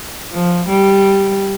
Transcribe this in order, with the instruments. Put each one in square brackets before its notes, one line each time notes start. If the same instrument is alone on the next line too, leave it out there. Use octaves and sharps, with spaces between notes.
[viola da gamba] F3
G3